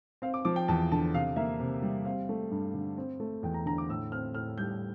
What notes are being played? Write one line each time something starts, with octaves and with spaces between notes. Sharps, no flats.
C4 F5
D6
F3 D6
G5
E2 A5
D3 A5
C3 F5
A#3 E5
C3
G3
C4 F5
A3
G2
D3
C4
A3
E2 G5
A#5
D3 A#5
D6
A2 E6
C4 F6
A2 F6
G3 G6